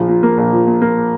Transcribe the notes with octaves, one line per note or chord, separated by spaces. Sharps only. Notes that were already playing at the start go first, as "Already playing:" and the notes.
Already playing: A#1 F3
A#2
A#3
A#1
F3
A#2
A#3